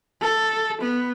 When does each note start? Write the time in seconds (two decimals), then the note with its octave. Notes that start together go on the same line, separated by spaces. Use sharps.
0.22 A4
0.81 B3